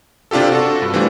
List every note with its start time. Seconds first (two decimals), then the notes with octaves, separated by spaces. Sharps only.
0.31 C3 D4 F4 G4 A4
0.52 F#4 A4
0.82 G2
0.94 E3 G3 A3 C4 D4 F4